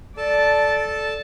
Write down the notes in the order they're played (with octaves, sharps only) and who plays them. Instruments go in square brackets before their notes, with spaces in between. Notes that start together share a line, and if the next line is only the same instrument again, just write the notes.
[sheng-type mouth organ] A4 A5 [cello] D5